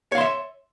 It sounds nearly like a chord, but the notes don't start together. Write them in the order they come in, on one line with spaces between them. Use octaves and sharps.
C#5 F5 C6 E5